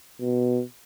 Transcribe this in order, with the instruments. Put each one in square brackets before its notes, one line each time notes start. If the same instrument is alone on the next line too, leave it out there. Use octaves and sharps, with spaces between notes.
[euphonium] B2